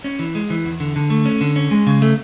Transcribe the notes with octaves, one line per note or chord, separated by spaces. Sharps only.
C#4
E3
G#3
E3
E2
D3
D3
A3
C#4
D3
C#4
G#3
C#3
A3